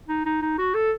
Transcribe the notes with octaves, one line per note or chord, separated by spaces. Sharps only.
D#4
D#4
D#4
F#4
A4